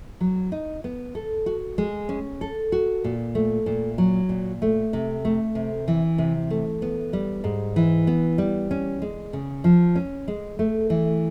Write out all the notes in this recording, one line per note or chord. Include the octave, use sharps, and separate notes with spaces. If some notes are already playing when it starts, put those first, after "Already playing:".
F#3
D#4
B3
A4
F#4
G#3
C#4
A4
F#4
A#2
A3
A#2
F#3
A#2
A3
C3
A3
C3
E3
C3
A3
B3
G3
G#2
E3
B3
G3
C#4
G#3
C#3
F3
C#4
G#3
A3
E3